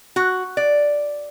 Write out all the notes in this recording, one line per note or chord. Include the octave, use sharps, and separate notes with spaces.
F#4
D5